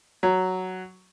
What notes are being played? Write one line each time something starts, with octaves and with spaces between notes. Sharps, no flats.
F#3